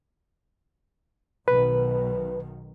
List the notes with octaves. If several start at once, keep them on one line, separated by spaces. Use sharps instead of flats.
B1 B2 D#3 B4